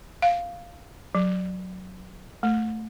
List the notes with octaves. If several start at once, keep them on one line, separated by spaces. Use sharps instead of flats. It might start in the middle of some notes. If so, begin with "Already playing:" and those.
F5
F#3
A3